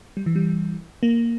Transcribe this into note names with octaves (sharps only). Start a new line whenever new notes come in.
G3
E3
G3
A#3